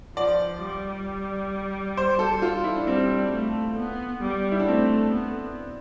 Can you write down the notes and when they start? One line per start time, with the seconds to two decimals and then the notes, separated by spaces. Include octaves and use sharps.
0.16 F3 D5
0.62 G3
1.97 C5
2.19 A4
2.42 F4
2.64 E4
2.76 D4
2.87 G3 C4
3.33 A3
3.78 B3
4.22 G3
4.52 E4
4.60 D4
4.68 A3 C4
5.13 B3